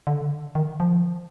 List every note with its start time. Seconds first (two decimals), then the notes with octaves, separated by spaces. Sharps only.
0.07 D3
0.55 D#3
0.80 F3